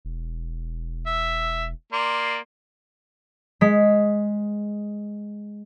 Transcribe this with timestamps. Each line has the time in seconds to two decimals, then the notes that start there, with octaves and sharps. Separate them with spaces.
0.05 E1
1.07 E5
1.93 A#3 D5 C6
3.61 G#3 B6